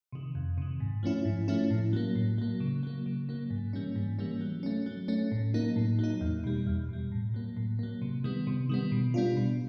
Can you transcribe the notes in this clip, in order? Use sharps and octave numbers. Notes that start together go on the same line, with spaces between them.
C3 D#3
F2
C3 D#3
G#2
F3 A3 C#4 E4
G#2
F3 A3 C#4 E4
A2
F#3 A#3
A2
F#3 A#3
C#3
F#3 A#3
C#3
F#3 A#3
G#2
E3 G3 A#3 C#4
G#2
E3 G3 A#3 C#4
F#3
A3 C#4
F#3
A3 C#4
A2
F#3 A#3 D#4
A2
F#3 A#3 D#4
E2
B2 G3
E2
B2 G3
A2
F#3 A#3
A2
F#3 A#3
C3
D#3 G3 B3
C3
D#3 G3 B3
B2
G3 B3 D4 F4
B2